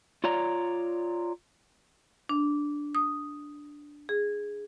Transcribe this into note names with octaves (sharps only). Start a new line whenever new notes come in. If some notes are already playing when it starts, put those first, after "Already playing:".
F4 C#5 D5 A#5
D4
D#6
G#4